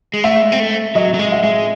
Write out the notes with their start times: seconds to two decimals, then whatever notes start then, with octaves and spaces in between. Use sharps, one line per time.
0.14 G#3
0.24 A3 E5
0.42 G#3
0.52 C4
0.60 A3
0.95 F#3 D#5
1.14 F#3
1.19 G#3
1.32 E5
1.44 G#3